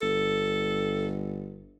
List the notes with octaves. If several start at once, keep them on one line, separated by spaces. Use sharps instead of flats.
G1 A4